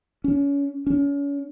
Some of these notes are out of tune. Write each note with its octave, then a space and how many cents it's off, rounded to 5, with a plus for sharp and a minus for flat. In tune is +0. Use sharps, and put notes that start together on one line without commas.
C#4 +30
C#4 +35